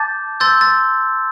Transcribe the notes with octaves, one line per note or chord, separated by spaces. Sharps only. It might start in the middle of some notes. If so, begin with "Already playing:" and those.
Already playing: A5 D6 G6 A6
C6 E6 G6 A6
A6